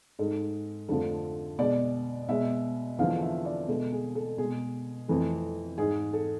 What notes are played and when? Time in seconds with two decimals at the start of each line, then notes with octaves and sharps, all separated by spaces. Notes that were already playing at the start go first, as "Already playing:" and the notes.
0.19 G#2 G#3 A4
0.88 F2 D3 F3 A3 A4
1.59 B2 G#3 D5
2.29 B2 G#3 E5
2.99 E2 D3 F3 F5
3.22 E5
3.45 D5
3.68 B2 G#3 A4
3.92 G#4
4.15 A4
4.38 B2 G#3 G#4
5.08 F2 E3 A3
5.78 G#2 G#3 G#4
6.13 A4